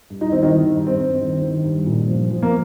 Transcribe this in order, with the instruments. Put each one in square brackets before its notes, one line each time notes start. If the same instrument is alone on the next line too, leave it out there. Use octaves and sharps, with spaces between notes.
[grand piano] G2
D#4
D#3 C4
D#3 D#4
D#3
G2
C4
G2
D#3
D#3
G2
A#2
F3
F3
A#3